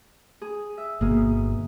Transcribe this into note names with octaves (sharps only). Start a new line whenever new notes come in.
G#4
E5
G1 B2 A#3 G#4